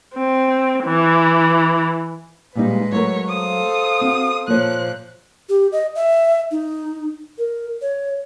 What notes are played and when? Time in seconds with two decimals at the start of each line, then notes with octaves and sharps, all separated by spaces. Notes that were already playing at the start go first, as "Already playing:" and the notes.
0.15 C4
0.85 E3
2.55 A#2 G3 G#3 D#4 B4
2.92 F#3 A3 A#4 C#5
3.29 A4 C5 F5 D#6
4.01 C4 F#4
4.48 A#2 F3 A#3 C#5 F#6
5.49 G4
5.72 D#5
5.95 E5
6.51 D#4
7.38 A#4
7.82 C#5